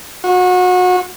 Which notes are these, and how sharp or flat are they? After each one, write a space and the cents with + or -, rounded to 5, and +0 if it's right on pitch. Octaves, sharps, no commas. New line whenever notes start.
F#4 -30